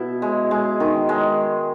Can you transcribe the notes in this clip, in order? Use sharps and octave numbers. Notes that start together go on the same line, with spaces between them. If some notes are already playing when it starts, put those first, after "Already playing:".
Already playing: B2 E4
G#3
G#3
D#3
G#3